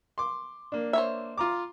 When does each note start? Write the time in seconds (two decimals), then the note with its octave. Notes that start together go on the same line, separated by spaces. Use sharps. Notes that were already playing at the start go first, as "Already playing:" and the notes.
0.18 C6 D6
0.72 A#3 D4
0.93 C5 C#5 E5
1.37 F4 A#5 D6